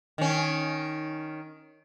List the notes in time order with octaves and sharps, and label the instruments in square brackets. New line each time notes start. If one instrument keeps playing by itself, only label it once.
[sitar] D#3 C#4